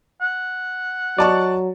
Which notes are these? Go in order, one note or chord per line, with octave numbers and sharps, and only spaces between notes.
F#5
F#3 D5 D#5 A5 C#6